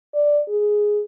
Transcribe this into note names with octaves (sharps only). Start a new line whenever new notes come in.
D5
G#4